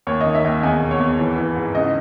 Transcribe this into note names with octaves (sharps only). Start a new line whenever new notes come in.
D#2 C#5
D#5
D#3
E5
D#2
E2 G#5
B2
C#5
E2
E3
E3
G#2
C#2 D#5